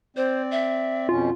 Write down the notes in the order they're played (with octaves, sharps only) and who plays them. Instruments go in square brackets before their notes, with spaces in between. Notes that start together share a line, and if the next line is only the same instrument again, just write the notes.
[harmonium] C4 D5 [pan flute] C5
[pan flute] E5
[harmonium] F2 B2 C#4 [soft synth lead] F4